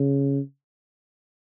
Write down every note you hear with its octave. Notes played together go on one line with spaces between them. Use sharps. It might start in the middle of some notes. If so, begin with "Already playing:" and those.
Already playing: C#3